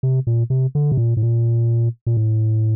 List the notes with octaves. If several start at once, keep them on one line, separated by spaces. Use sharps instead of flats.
C3
A#2
C3
D3
C3
A#2
A2
A#2
A#2
A2